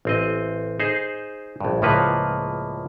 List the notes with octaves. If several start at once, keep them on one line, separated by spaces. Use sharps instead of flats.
A1 C4 D#5
D#4 G#4 C5
A#1 G2
C#2 A2 F3 A#3 B4 F#5